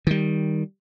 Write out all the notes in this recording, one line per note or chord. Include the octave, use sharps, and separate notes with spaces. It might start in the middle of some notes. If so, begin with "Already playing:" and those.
D#3 G3